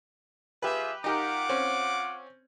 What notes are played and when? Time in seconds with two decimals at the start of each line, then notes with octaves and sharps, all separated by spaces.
0.62 F4 G4 G#4 B4 E5
1.04 D#4 F4 G4 A#4 F#5 D6
1.49 C4 C#4